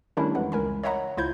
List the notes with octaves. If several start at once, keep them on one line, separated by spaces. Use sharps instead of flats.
D#3 G3 A3 C#4 D4 E4
F2 E3 G#3 F#5
C#2 A#4 G#5 B5
C#5 D#5 E5 F#5 A#5 B5
C#2 E4 F4 C5 G6 G#6